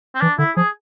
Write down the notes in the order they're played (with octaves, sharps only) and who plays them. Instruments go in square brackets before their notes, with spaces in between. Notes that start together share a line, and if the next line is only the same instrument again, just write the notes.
[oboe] C4
[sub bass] E3 [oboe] D4
[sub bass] D3 [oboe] E4
[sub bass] F3 [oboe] G#4